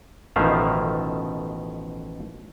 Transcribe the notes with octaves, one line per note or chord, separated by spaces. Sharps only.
A1 B2 D#3 F3 E5 F5